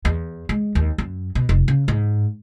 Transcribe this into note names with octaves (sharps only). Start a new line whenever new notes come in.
E2
G#3
D#2
F#2
B2
F1
C#3
G#2